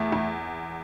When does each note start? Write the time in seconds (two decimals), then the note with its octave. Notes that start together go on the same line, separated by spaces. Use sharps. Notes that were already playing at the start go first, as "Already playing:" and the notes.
Already playing: E2 A3
0.12 E2